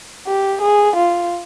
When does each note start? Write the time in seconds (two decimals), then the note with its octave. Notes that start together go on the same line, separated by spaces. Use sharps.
0.27 G4
0.61 G#4
0.96 F4